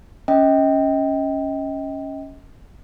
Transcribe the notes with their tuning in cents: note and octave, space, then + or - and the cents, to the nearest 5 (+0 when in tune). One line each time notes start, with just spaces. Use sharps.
C#4 +0 D#5 +35 G5 +0